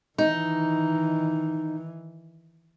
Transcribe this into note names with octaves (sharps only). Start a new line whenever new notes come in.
D#3 E3 D#4